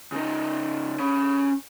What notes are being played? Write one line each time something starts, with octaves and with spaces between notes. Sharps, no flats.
C#3 D#4
C#4 B5